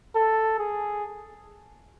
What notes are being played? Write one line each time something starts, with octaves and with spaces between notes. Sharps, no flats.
A4
G#4